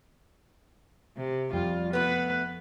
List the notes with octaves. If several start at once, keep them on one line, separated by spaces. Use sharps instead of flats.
C3
F2 G3 F4
A3 B3 B4 F#6